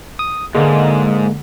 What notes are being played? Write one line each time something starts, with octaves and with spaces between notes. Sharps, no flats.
D#6
G#2 D3 G#3 A#3